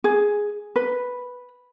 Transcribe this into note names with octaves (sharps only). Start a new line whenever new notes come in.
G#4
B4